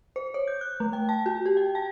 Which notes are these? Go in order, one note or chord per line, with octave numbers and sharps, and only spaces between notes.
C5
C#5
G6
F#6
A3
G5
A5
F#4
G4
G5
A5